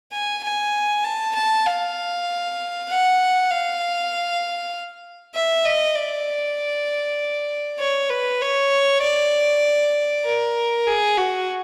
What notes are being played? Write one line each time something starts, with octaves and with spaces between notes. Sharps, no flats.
G#5
G#5
A5
A5
F5
F#5
F5
E5
D#5
D5
C#5
B4
C#5
D5
A#4
G#4
F#4